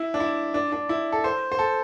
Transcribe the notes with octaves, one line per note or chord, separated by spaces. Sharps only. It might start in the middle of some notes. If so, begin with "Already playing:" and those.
Already playing: E4
D4
E4
D4
D4
E4
A4
C5
C5
A4